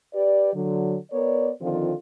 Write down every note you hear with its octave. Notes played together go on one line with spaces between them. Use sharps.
G4 B4 D5
D3 F#3
B3 A#4 C#5 D5
D3 D#3 F3 C4 F4